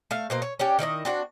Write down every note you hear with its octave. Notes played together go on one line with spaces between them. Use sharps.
A3 E5 F5
B2 A#3 C5
C#5
C#4 D4 G4
D#3 E4 F#4 D#5
C4 D4 F#4